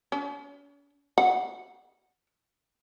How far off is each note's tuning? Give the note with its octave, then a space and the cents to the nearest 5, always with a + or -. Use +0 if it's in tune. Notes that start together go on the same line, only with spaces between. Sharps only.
C#4 +45
F#5 +5